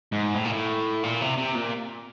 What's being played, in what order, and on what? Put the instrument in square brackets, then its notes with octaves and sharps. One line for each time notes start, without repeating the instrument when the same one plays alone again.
[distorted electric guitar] G#2
A2
A#2
A2
A#2
C3
C3
A#2